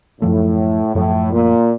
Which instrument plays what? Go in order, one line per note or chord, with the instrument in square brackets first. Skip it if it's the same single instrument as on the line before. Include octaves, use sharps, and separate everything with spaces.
[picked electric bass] F#2 F3 A3 [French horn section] A2
[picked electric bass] F#2 F3 A3 [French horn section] A2
[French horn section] A#2